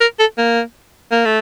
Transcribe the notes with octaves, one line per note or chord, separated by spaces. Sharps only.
A#4
A4
A#3
A#3
A3